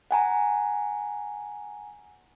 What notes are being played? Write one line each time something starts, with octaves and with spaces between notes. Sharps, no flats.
F#5 G#5 A#5